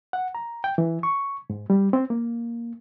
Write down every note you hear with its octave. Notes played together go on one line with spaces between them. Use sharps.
F#5
A#5
G5
E3
C#6
G#2
G3
C4
A#3